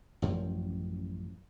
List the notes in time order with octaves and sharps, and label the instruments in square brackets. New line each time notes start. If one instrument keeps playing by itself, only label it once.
[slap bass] A1 F#2 F3